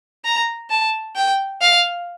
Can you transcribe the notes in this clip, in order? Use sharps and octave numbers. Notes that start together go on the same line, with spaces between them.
A#5
A5
G5
F5